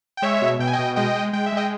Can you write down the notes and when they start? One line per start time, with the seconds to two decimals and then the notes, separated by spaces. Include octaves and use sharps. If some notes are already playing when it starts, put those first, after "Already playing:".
0.17 G5
0.22 G#3 C#5 E5
0.42 B2
0.59 B2 G5
0.67 G#5
0.73 D#5 G5
0.79 B2
0.96 G#3 D#5 G5
1.15 G#3
1.33 G#3 G5
1.46 E5
1.52 G#3 D#5 G5